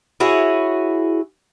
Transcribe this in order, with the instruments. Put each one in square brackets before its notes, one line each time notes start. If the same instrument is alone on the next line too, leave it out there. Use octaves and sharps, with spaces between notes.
[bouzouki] E4 F#4 G#4 C#5